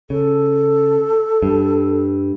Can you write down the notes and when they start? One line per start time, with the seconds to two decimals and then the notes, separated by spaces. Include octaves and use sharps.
0.10 C#3 A4
1.42 G2